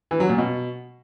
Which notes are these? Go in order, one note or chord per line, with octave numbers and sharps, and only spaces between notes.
E3
F#3
A#2
B2